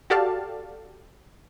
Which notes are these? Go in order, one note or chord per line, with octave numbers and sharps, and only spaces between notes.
F#4 G4 A4 D5 F5 A5